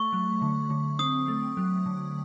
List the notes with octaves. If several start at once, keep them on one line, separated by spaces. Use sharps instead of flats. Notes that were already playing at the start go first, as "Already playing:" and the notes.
Already playing: A3 C#6
F#3
D3
D3
C4 D#6
A3
F#3
D3